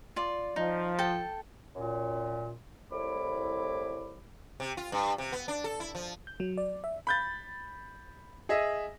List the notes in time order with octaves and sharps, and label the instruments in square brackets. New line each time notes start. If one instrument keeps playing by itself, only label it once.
[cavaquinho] F4 D5
[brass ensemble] F3 [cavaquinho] D#4
[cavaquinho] A4 G5 A5
[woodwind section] F#2 A#2
C2 A2 E4 B5 D6
[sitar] C3
F4
G2
C3
B3
D4
A4
E4
F3
[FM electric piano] G6
F#3
D5
E5
[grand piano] B5 G6 A6
G#4 D#5 E5